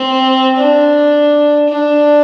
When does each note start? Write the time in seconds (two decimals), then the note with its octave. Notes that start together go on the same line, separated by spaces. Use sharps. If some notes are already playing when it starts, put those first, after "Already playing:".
Already playing: C4
0.57 D4
1.69 D4